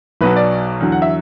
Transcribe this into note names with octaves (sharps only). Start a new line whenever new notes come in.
B1 B2 F#3 B4
D5
E2 D3 F#3
F#5
E5